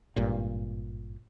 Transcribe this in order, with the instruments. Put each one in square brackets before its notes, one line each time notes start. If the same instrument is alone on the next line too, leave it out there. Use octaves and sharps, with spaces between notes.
[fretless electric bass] G#1 G2 A#2